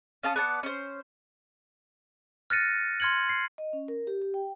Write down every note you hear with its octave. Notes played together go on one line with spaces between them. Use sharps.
C#4 F5 A5 D#6
B3 D5 F#5 A5
C#4 C5
F6 F#6 A6 A#6 C#7 D#7
C6 F6 G#6 C#7 F#7
C7
D#5
C#4
A#4
G4
G4
G5